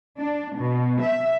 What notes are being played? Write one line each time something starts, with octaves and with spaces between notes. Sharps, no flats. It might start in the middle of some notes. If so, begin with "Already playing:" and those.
D4
B2
E5